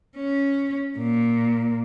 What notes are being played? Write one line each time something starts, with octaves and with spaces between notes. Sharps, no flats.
C#4
A#2